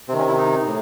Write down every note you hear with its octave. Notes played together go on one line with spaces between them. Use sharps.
C3 D#3 C4
C#4
E4
D#4
A2